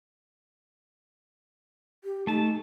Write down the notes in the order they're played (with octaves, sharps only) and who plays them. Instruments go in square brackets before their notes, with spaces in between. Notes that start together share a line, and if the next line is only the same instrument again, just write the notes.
[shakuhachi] G4
[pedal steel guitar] A3 A5 [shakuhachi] D#4